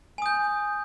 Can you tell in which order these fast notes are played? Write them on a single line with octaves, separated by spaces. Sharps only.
G#5 D#6 G6